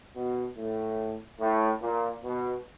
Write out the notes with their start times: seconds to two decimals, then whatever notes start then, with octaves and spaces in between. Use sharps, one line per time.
0.15 B2
0.57 A2
1.40 A2
1.82 A#2
2.24 B2